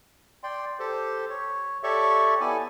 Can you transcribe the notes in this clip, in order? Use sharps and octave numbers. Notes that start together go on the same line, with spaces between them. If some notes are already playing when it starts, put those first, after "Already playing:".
D5 G5 C6
G4 A4 C5
C#5
G4 A4 C#5 D5 E5 C#6
B3 E4 G4 A4 D5 G#5